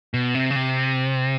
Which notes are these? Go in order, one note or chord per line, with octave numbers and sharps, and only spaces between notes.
B2
C3
C#3
C3